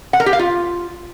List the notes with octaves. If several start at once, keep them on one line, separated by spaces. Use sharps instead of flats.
F#5
A#4
G4
F5
F4